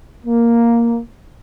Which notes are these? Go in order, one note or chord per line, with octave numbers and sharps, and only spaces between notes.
A#3